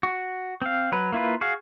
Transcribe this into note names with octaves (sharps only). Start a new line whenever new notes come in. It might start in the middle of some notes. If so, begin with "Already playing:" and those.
F#4
C4 F5
F#3 B4
A#3 E4 F4 B4
F#4 G#4 F5